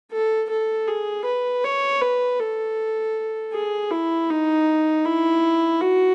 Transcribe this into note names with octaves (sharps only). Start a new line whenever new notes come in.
A4
A4
G#4
B4
C#5
B4
A4
G#4
E4
D#4
E4
F#4